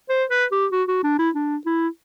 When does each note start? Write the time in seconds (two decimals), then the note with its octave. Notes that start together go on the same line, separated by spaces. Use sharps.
0.10 C5
0.30 B4
0.52 G4
0.72 F#4
0.88 F#4
1.03 D4
1.19 E4
1.35 D4
1.66 E4